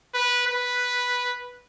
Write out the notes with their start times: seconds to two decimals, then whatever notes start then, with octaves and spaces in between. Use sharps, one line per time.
0.14 B4
0.47 B4